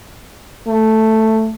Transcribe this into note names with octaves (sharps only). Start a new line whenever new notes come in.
A3